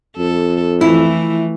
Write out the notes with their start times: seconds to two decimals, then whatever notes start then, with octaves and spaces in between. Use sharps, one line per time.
0.17 F2 A4
0.81 E3 F3 A3 E4